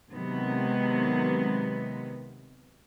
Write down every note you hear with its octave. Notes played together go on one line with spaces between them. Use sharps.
C3 D#3 F#3 G#3 B3